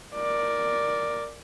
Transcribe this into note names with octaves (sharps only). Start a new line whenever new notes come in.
A#4 D5